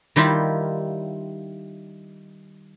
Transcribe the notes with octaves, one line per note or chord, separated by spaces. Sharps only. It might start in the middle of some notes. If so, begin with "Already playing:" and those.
D#3 G3 E4 F4